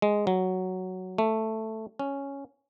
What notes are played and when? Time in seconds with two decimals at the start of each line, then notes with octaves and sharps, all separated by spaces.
0.02 G#3
0.27 F#3
1.18 A3
1.99 C#4